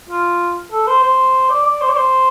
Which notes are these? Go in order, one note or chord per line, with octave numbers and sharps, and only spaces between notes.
F4
A4
C5
C5
D5
D5
C5
D5
C5